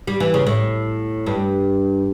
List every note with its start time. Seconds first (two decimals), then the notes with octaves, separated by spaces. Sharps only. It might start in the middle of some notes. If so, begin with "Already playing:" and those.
0.07 G3
0.20 E3
0.34 C#3
0.47 A2
1.26 G2